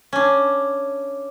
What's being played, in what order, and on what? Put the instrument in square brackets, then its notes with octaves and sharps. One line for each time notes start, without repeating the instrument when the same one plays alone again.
[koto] C#4 D4